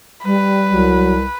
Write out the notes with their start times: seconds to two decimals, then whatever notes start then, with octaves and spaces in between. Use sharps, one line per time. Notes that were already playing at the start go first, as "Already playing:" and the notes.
0.25 G3 B4
0.72 C2 F#3